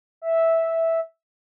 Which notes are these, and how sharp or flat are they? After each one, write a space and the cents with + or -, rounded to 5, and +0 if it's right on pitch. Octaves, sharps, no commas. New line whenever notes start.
E5 -5